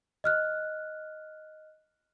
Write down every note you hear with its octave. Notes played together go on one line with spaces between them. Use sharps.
D#5 F6 F#6